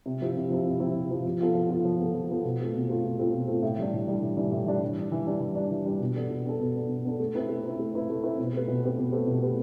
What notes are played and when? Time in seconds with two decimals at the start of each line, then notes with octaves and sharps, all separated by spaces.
0.06 C3
0.21 F3 C4 E4 G4
0.36 C3
0.50 F3 C4 E4 G4
0.66 C3
0.80 F3 C4 E4 G4
0.95 C3
1.10 F3 C4 E4 G4
1.25 F3
1.40 B3 F4 A4
1.55 F3
1.69 B3 F4 A4
1.85 F3
1.99 B3 F4 A4
2.14 F3
2.29 B3 F4 A4
2.44 B2
2.59 A3 C4 F4
2.73 B2
2.89 A3 C4 F4
3.03 B2
3.18 A3 C4 F4
3.32 B2
3.48 A3 C4 F4
3.62 A2
3.78 E3 G3 D4
3.93 A2
4.07 E3 G3 D4
4.22 A2
4.37 E3 G3 D4
4.52 A2
4.66 E3 G3 D4
4.82 E3
4.97 G3 D4
5.12 E3
5.27 G3 D4
5.40 E3
5.56 G3 D4
5.71 E3
5.85 G3 D4
6.00 B2
6.16 B3 D4 A4
6.30 B2
6.45 B3 D4 A4
6.60 B2
6.75 B3 D4 A4
6.89 B2
7.05 B3 D4 A4
7.19 A3
7.35 C4 E4 B4
7.49 A3
7.64 C4 E4 B4
7.79 A3
7.94 C4 E4 B4
8.09 A3
8.23 C4 E4 B4
8.39 B2
8.53 A3 C4 G4 B4
8.68 B2
8.83 A3 C4 G4 B4
8.98 B2
9.12 A3 C4 G4 B4
9.27 B2
9.43 A3 C4 G4 B4